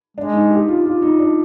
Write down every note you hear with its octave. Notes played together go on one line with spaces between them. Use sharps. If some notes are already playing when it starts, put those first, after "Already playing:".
G#3 D4
D#4
G4
F4
F4
D#4
D4